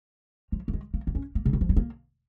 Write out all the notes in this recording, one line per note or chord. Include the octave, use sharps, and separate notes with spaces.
F3
A#3
G#3
A#3
A#3
C#4
A#3
C#3
D#3
F3
G#3
A#3